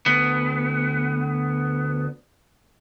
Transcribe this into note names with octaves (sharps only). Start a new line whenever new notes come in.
D2 B3